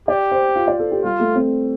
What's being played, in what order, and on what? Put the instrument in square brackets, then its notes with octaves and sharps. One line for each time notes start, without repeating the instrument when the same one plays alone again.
[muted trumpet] G4 [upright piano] D5
[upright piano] C5
F4
D5
A4
G4
[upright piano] G3 [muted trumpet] F4
[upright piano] A3
C4